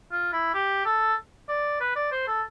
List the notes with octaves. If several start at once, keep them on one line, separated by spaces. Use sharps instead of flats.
F4
E4
G4
A4
D5
B4
D5
C5
A4